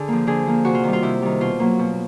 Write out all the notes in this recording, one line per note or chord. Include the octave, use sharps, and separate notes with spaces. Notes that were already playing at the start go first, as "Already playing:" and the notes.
Already playing: D3 G#4
F3 A#3
D3 G#4
F3 A#3
C3 F#4
F4
D#3 G3
F4
C3 E4
D#3 G3
B2 F4
F#3 A#3
B2